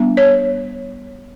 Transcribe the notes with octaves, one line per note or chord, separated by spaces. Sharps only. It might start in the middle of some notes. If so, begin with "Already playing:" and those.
Already playing: G3 B3 D4
C#5